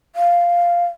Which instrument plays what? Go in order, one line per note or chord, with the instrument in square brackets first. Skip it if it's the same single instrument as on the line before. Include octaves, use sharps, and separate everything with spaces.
[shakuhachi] F5